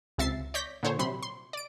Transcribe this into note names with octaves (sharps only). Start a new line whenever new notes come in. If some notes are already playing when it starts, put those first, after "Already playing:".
C#2 C3 E5 A6 C7
C#5 D5 G6 A#6 B6
A#2 D3 C5 C#5
C3 F#3 B5 C6
C6
D5 D7